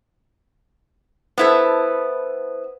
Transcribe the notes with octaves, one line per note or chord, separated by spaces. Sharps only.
B3 E4 A4 B4 C5